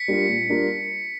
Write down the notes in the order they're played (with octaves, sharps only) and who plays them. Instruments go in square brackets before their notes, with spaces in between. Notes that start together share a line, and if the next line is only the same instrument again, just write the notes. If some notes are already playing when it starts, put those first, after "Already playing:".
Already playing: [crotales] B6 C#7
[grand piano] G3 A#3 D4 F4
A#2
G3 A#3 D4 F4